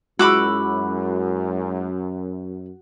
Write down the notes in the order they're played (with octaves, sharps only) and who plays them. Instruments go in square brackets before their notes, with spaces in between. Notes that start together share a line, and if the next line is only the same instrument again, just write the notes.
[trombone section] F#2 [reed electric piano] G#3 E4 G#4 [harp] F#4 [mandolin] B5 D6 E6